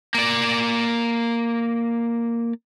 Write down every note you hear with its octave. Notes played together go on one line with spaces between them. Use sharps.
A#3 D5